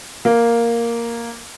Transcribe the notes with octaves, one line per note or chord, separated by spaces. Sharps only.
A#3